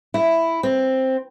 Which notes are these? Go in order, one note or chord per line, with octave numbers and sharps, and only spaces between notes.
E4
C4